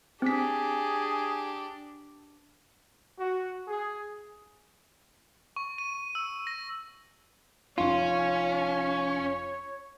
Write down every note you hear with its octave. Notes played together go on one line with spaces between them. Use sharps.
C4 D4 G4 G#4 B6
F#4
G#4
C#6
D#7
E6
A#6
F1 C#4 F4 C#5 C6